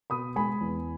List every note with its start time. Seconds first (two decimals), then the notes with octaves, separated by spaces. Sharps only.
0.10 B2 B5 D#6
0.36 G#3 G#5 B5
0.61 E2